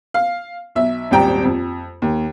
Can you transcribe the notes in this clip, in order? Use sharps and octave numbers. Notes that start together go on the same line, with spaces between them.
F5
B1 E5
D#1 G#1 G3 G5 A#5
F2
D#2